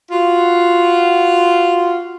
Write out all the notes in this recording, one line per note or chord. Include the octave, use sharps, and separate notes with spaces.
F4 F#4